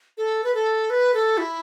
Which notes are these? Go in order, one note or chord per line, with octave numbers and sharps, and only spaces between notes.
A4
B4
A4
B4
A4
E4